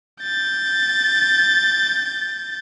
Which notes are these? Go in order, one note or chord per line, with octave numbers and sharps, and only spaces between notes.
G6 A6